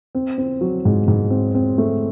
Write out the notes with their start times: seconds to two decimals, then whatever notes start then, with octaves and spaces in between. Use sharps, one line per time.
0.15 C4
0.38 C4
0.61 F#3
0.85 G#2
1.08 G#2
1.30 C4
1.54 C4
1.78 A3